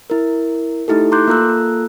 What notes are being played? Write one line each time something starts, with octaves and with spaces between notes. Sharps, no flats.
E4 A#4
A3 D#4 E4 G4 A4
A#5 C6 D6 F#6 G6
A#3 F4 A4 A#5 E6 F#6